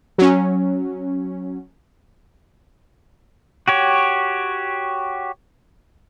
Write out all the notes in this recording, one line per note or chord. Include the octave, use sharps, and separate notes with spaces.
F#3 C#4
F#4 G4 C#5